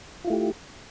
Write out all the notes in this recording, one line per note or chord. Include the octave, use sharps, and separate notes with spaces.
A3 E4 F4 G4